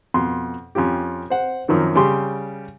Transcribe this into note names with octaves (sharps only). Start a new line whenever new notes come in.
F2 B2 C6
F2 C#4 F4 G4
C5 F#5
F#2 D#3 F3 C4
C#3 G3 G4 C6